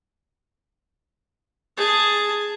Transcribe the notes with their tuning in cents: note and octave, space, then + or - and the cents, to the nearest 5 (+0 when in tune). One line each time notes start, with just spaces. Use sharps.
G#4 +0 A5 +0